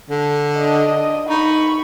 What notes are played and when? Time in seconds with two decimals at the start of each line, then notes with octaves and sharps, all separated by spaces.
0.10 D3
0.57 D4 D#5
1.29 D#4 B5 C#6